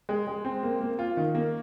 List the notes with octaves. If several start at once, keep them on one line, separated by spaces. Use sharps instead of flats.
G#3
G#3
C4
A#3
A#3
F4
D#3
A#3